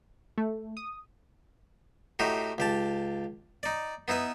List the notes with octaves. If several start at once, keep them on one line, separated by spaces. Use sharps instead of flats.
A3
D#6
A2 D#4 F#4 G4
C#2 G4 A5
D#4 D5
B3 D#4 E4 B4